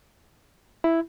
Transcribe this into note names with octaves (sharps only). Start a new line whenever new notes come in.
E4